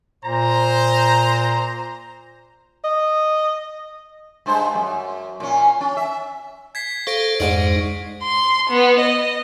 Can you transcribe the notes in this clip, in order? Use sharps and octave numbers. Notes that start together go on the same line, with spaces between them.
A#2 C5 A#5
D#5
G2 G#3 C5
F#2
A#2 C#4
C#4
E5
G#6 B6 C7
A4 C5 F5 C#6 A#6 D7
F2 G#2 D#4 D5
C6
B3
D#5